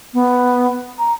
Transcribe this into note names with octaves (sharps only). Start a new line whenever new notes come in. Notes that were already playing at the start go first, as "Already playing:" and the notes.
B3
A#5